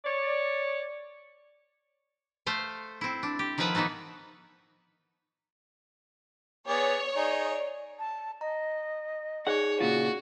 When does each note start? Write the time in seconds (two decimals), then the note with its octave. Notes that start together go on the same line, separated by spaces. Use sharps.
0.05 C#5 D5
2.46 A3 C5 F5
3.01 C4 E4
3.23 D4
3.39 G4
3.58 D#3 F3 G#4 B4 E5 F#5
3.75 E3 B3 D#4 F#4 A4
6.68 B3 G#4 C#5 D5
7.16 D#4 G#4 D5
7.99 A5
8.41 D#5 A#5
9.47 D#4 G#4 C#5 D5 F#5
9.80 A#2 C#3 F4 F#4